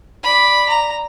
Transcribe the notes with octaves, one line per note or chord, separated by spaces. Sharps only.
D5 B5
A#5